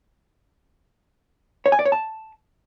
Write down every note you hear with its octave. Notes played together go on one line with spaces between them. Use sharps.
C#5
G#5
D5
C#5
A5